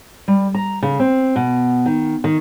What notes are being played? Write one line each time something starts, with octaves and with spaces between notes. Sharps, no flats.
G3
A#5
C#3
C4
B2
D#3
D#3